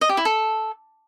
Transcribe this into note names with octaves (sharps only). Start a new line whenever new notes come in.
D#5
G4
E4
A4